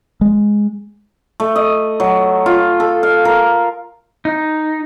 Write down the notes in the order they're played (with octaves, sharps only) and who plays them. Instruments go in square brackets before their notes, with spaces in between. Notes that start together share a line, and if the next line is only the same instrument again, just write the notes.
[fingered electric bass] G#3
[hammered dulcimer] A3
D#5
F#3
F4
A4
F5
A#4
[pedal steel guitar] D#4